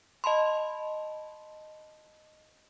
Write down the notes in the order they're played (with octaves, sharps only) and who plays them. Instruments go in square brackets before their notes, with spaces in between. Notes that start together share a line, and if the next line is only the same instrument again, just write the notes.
[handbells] D#5 A5 B5 C6